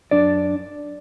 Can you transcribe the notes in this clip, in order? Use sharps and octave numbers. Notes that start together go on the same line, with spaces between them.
F#2 D4 D5